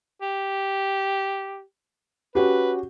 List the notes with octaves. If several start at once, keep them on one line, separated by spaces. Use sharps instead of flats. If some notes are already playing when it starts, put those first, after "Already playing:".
G4
C#4 F#4 G4 B4